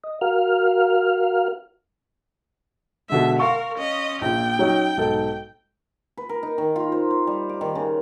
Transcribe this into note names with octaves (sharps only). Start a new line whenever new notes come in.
D#5
F#4 A#4 F5 F6
B2 D3 G#3 E5
A#4 F5 C6 C#6
C#4 D#5
A#1 A#2 G5
F#3 C#4 D#4
B1 G#2 A4
B4
A#4
D#4
D#3
F4
C5
C5
G3
D6
D#3
C#3